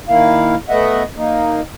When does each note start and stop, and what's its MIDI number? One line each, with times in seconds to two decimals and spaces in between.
0.09 0.55 51
0.09 0.55 58
0.09 0.55 64
0.09 0.55 77
0.69 1.03 57
0.69 1.03 59
0.69 1.03 75
0.69 1.03 76
0.69 1.03 78
1.17 1.61 58
1.17 1.61 63